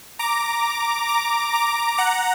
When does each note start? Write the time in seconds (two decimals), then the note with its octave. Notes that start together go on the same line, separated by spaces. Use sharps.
0.19 A#5 D6
1.09 A#5 D6
1.53 A#5 D6
1.98 F#5 A#5